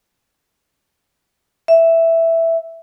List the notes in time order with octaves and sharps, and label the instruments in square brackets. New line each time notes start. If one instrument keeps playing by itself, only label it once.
[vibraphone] E5